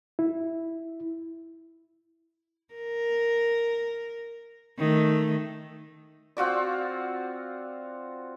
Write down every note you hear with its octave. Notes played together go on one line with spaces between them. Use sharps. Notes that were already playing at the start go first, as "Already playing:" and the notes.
E4
A#4
D#3 A3
C4 F4 F#4 D5